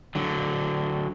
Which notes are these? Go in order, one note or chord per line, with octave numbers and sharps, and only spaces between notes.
D3 F#3